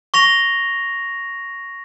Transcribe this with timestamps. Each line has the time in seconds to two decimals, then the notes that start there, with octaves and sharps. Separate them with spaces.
0.14 C#6 A#6 F7